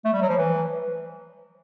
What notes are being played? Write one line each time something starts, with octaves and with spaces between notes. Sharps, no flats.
A3
G3
F#3
F3
E3